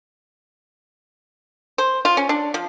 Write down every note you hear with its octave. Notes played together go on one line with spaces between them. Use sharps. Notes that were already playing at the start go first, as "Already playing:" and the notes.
C5
F4
C#4
D4
F3